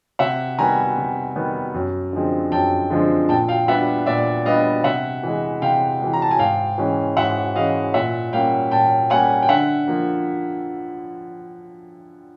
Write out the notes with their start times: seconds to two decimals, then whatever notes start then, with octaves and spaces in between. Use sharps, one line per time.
0.19 C3 E5 F#5
0.58 D#3 G3 B3 G#5 A#5
0.97 C3
1.36 D#3 G3 B3
1.74 F#2
2.13 D3 F3 G#3 C4
2.52 F#2 G5 A5
2.90 D3 F3 G#3 C4
3.29 A#2 G5 A5
3.48 F5 G5
3.68 G3 B3 D4 E5 F#5
4.06 A#2 D5 E5
4.45 G3 B3 D4 D#5 F5
4.84 C3 E5 F#5
5.23 E3 G#3
5.62 C3 F5 G5
6.01 E3 G#3
6.13 A#5
6.22 A5
6.31 G#5
6.39 G#2 F5 G5
6.78 E3 G#3 C#4
7.17 G#2 E5 F#5
7.56 E3 G#3 C#4 D#5 F5
7.94 A#2 E5 F#5
8.33 G3 A#3 C#4 F5 G5
8.71 A#2 G5 A5
9.10 G3 A#3 C#4 F#5 G#5
9.43 G5
9.49 D3 E5 F#5
9.88 F3 A#3